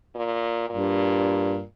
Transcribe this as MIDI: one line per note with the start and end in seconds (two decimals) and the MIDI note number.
0.15 0.68 46
0.70 1.64 43
0.70 1.62 46